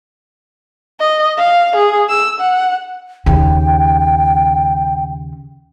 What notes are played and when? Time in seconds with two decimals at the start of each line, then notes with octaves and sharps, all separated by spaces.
1.00 D#5
1.37 F5
1.76 G#4
2.09 E6
2.40 F#5
3.26 D#2 C#3 G5